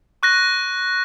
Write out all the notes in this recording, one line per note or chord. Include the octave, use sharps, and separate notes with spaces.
C#6 F#6 A#6